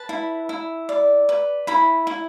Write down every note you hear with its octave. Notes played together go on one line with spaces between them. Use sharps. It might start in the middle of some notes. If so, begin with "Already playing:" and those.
Already playing: B4 A5
E4
E4
D5
B4
E4 B5
E4